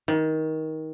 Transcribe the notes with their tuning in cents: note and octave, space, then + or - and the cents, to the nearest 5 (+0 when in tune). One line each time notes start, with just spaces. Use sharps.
D#3 +20